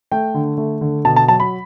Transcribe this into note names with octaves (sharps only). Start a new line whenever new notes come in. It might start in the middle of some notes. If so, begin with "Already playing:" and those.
A3 G5
D3
A3
D3
B2 A5
A5
F#3 A5
B5